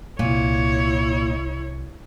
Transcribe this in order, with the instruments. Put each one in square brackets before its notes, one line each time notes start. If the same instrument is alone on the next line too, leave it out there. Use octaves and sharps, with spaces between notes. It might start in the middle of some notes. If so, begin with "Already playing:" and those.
[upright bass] C2 [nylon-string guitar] A#2 [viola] E4 C#5